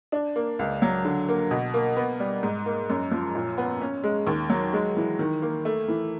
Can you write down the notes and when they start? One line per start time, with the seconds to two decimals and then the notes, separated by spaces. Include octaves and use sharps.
0.12 D4
0.36 A#3
0.59 C#2
0.82 F#3
1.05 D3
1.29 A#3
1.51 B2
1.74 A#3
1.96 B3
2.20 G3
2.43 G#2
2.66 A#3
2.90 F#2
3.11 F3
3.35 A#2
3.58 B3
3.81 C#4
4.04 G#3
4.27 D#2
4.50 F#3
4.73 G#3
4.97 E3
5.19 D#3
5.42 A#3
5.65 A3
5.88 E3